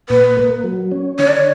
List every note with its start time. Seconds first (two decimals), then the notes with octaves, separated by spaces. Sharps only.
0.09 A#2 B4
0.37 A#3
0.64 F#3
0.92 C#4
1.19 D3 C#5
1.28 D5
1.36 C#5